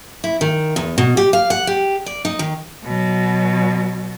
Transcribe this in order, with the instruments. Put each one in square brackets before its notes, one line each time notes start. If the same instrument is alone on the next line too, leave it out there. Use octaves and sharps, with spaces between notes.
[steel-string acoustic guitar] E4
D#3
E2
B2
G4
F5
F#5
G4
D5
D#4
D#3
[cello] B2 F#3